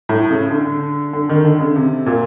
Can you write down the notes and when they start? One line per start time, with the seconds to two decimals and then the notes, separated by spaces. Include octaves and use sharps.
0.09 A2
0.30 C#3
0.50 D3
1.13 D3
1.29 D#3
1.45 D3
1.60 C#3
1.76 C3
2.06 A#2